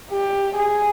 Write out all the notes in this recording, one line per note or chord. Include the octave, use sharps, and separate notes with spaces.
G4
G#4